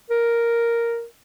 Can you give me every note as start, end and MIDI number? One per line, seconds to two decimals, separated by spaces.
0.11 1.04 70